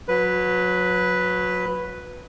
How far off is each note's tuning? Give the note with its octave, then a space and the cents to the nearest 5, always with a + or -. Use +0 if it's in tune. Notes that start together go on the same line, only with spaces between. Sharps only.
F#3 -25 B4 +0